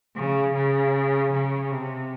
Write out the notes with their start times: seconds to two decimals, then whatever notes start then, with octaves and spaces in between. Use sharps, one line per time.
0.16 C#3
0.54 C#3
1.33 C#3
1.71 C3